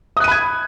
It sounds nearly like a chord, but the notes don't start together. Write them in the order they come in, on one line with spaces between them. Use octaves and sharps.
D#6 F#6 D#7 B5 G#6